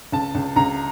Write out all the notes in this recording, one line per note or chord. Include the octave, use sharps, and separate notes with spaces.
C#2 A5
C#2
C#2 A#5